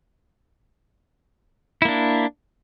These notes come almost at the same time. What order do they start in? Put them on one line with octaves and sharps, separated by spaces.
E4 A#3 D4